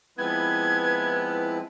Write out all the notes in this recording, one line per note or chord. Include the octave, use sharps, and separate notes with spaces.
F3 G#3 B3 C4 E4 B4 G#6